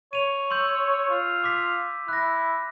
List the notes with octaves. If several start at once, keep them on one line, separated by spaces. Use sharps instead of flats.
C#5 D#7 F7
C6 E6 G6
F4
D6 B6
E4 F#6 A#6